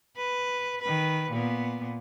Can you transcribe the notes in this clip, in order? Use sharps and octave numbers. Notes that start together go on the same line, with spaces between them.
B4
D#3 B4
A#2 B3